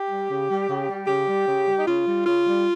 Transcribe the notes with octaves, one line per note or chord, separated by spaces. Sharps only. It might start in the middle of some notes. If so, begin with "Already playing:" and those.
Already playing: G4
G3
C#3
G3
C#3
G3
C#3 G4
G3
C#3
G3
D#4
C#3 F4
G3
C#3 F4
G3